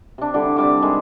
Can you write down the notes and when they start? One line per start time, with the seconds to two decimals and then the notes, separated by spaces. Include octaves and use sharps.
0.18 C3 D4
0.34 D3 G3 E4 D5
0.56 C3 G3 D6
0.81 D#3 G#3